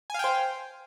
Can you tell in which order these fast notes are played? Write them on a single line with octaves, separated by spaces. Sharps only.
G#5 F5 G5 C5